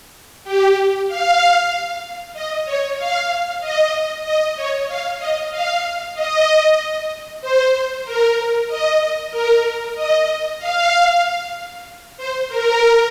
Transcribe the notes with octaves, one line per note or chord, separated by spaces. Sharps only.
G4
F5
D#5
C#5
F5
D#5
D#5
C#5
F5
D#5
F5
D#5
C5
A#4
D#5
A#4
D#5
F5
C5
A#4